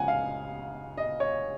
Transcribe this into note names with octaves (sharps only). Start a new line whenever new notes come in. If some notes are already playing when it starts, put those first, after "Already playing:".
Already playing: C#2 C#3 F3 F#5 G#5
F5
D#5
C#5